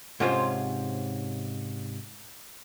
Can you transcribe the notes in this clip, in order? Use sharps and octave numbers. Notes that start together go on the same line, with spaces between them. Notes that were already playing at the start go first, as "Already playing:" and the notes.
G#2 C3 C#4 F4 C5 C#5